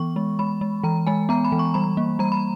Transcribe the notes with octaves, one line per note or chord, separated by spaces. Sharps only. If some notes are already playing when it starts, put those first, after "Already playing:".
Already playing: E3 B3 C#6
G#3
G#3 B5
G#3
E3 A#5
G#3 G#5
B3 A#5
B5
E3
C#6
G3 B5
A#3
G3 A#5
B5